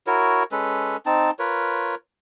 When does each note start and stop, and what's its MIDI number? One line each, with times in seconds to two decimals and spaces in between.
0.07 0.43 64
0.07 0.43 66
0.07 0.43 70
0.07 0.43 73
0.52 0.97 56
0.52 0.97 61
0.52 0.97 69
0.52 0.97 71
1.06 1.30 60
1.06 1.30 63
1.06 1.30 81
1.39 1.95 65
1.39 1.95 70
1.39 1.95 71
1.39 1.95 73